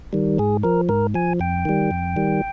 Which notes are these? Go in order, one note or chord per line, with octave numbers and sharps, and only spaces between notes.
D#3 G3
G#2 G#4
F3 A#4
G#2 A#4
F3 G#5
F2 G5
D#3 G3
F2
D#3 G3